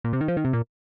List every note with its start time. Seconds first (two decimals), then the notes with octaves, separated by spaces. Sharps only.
0.04 A#2
0.13 C3
0.21 D#3
0.28 F3
0.37 D#3
0.45 C3
0.53 A#2